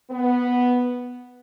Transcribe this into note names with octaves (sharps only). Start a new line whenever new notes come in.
B3